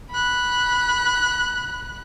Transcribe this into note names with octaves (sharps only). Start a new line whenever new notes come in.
B5 F#6